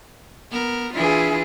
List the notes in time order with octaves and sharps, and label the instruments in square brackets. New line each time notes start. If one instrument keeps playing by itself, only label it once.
[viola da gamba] B3 A#4
[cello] E3 G#4 [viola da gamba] D4 E4 F4